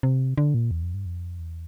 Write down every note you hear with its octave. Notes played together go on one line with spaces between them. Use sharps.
C3
D3
A#2
E2
F2
G2
F2
E2